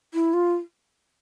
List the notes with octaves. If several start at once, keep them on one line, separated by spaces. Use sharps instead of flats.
E4
F4